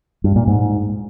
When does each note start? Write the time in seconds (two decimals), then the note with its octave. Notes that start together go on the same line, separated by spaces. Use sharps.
0.24 G2
0.36 A#2
0.48 G#2